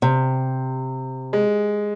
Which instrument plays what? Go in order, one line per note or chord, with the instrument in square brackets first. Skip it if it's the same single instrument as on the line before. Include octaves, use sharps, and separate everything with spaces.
[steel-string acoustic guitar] C3
[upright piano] G#3